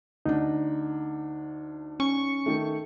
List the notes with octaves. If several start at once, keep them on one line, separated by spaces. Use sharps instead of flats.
D2 D4 D#4
C#4 C#6
D#3 A3